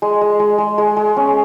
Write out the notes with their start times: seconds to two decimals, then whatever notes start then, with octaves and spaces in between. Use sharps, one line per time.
0.02 G#3
0.21 G#3
0.39 G#3
0.58 G#3
0.78 G#3
0.97 G#3
1.17 C#4